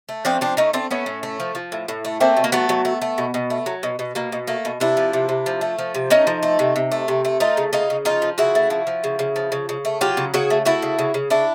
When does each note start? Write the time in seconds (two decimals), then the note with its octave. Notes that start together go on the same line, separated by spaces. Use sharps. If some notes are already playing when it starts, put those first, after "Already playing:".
0.09 A3
0.25 F3 C4 D4
0.41 F3 C4 D4
0.57 A3 C#4 D#4
0.73 A3 C4 D4
0.91 A3 B3 C#4
1.06 A2
1.23 A3
1.40 F3
1.55 F3
1.72 A2
1.88 A2
2.05 A3
2.20 A3 A#3 C4
2.37 B2
2.44 A#3
2.52 F#3 A3 B3
2.69 F#3
2.85 A3
3.02 A3
3.18 B2
3.34 B2
3.50 A3
3.66 F#3
3.83 B2
3.99 B2
4.15 B2 A#3
4.32 B2
4.47 A3 A#3
4.65 B2
4.80 C3 D4 E4
4.97 F3
5.13 C3
5.29 C3
5.46 F3
5.61 A3
5.79 F3
5.95 C3
6.10 A3 C#4 D#4
6.27 F3
6.43 A3
6.59 C3
6.76 C3
6.92 A3
7.08 C3
7.25 A3
7.40 A3 D#4 F4
7.57 C#3
7.73 C#3 D#4 F4
7.90 C#3
8.05 F3 D#4 F4
8.22 F3
8.38 C#3 E4 F#4
8.55 A3
8.70 F3
8.87 F3
9.04 C#3
9.19 C#3
9.36 F3
9.52 C#3
9.69 C#3
9.85 A3
10.01 F#3 F4 G4
10.17 C#3
10.34 C#3 F#4 G#4
10.50 A3
10.65 A3 E4 F#4
10.82 C#3
10.99 C#3
11.14 C#3
11.30 C#3 D4 E4